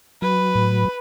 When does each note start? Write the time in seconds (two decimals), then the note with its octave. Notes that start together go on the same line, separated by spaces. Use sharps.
0.22 F#3 B4
0.55 A2